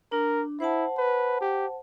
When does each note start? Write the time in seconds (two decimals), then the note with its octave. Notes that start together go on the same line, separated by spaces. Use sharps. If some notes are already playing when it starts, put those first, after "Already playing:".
0.12 D4 A#4
0.60 E4 C5 F#5 A5
0.97 B4
1.41 G4